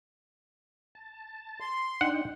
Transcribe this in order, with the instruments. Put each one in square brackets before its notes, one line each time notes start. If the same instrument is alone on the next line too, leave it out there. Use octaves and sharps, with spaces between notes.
[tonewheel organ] A5
[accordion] C6
[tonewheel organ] D4 D#4 G5 [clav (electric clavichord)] F#5